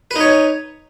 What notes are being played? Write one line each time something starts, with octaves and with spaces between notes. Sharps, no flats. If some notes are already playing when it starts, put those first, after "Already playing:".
D#4 B4 C#5